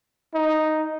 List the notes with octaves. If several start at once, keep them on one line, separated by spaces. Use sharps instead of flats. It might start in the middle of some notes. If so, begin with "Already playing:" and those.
D#4